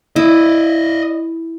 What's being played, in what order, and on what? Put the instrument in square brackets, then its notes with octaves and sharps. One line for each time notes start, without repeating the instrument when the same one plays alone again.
[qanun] E4 [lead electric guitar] D5 D#5